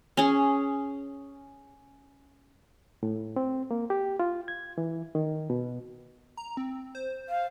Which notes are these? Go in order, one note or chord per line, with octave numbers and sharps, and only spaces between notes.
C#4 G#4
A2
C4
A#3
G4
F4
G#6
E3
D#3
B2
A#5
C4
C5
F5